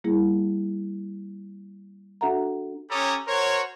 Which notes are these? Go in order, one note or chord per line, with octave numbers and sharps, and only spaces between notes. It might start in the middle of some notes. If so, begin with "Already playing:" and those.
G3 A#3 E4 G#4
D4 F#4 A4 E5 F#5 A#5
C#4 G4 A4 C#5 A#5 D#6
F#4 A#4 C5 C#5